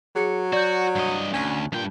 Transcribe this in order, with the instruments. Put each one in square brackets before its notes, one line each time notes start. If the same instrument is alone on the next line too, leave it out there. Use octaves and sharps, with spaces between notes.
[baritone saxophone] F#3 [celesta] G#4 C#7
[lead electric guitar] F#4 [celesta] D5 G6
[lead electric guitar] G2 D#5
[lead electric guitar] D2 [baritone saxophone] C#4
[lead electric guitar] G2 G5 [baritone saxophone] A#2